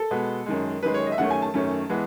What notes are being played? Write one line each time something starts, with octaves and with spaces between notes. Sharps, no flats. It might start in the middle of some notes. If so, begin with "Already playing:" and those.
Already playing: A4
B2 G#3 B3
F#2 D#3 G#3
F#2 D#3 G#3 B4
C#5
D#5
E5
F#2 D#3 A3 C#4 F#5
G#5
A5
F#2 D#3 A3 C#4
E3 G#3 B3